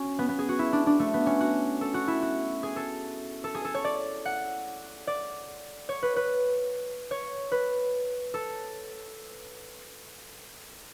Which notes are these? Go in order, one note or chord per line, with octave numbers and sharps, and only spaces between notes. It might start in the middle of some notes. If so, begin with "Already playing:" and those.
Already playing: C#4 F#4
B3
B3
G#4
F#4
E4
D4
D4
A3
B3
C#4
F#4
A4
F#4
E4
F#4
G#4
A4
A4
G#4
A4
C#5
D5
F#5
D5
C#5
B4
B4
C#5
B4
A4